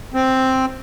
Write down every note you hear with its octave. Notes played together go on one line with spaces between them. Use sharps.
C4